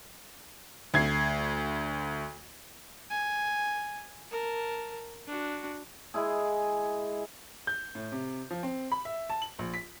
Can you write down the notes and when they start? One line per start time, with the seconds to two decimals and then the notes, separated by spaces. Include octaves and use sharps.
0.94 D2 G#6 C7
3.10 G#5
4.31 A#4 A5
5.27 D4 F#4
6.14 G#3 E4 G#4
7.67 G6
7.95 A2
8.12 C3
8.51 F3
8.63 C4
8.92 B5
9.05 E5
9.30 A5
9.42 F#7
9.59 A#1
9.74 B6